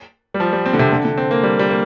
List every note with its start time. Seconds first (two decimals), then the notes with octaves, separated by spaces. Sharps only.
0.34 G3
0.40 F3
0.53 G3
0.66 C4
0.73 D3
0.79 C3
0.92 D3
1.05 D3
1.17 C4
1.31 A#3
1.43 G3
1.59 G3
1.69 A#3